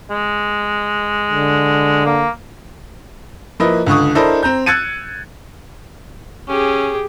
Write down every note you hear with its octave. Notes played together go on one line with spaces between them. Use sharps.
G#3
D3
A#3
F3 A#3 E4 B4 D#5
C#2 D3 C#6 D#6
D4 E4 A4 A#4 C5 D#5
C4 A#5 G6
E6 F#6 G#6 A6 C#7 D#7
C#4 G4 G#4